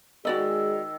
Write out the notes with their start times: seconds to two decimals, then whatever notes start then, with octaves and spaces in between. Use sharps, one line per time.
0.25 D#3 G#3 F#4 G#4 D5 D#5 E6